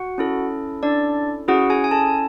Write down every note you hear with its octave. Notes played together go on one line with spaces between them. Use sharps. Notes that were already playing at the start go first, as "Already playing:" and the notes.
Already playing: F#4 F#5
C#4 E4 A4
D4 D5
C#4 E4 F#4 G#4 F#5
G#4 G#5
G#5
A4 A5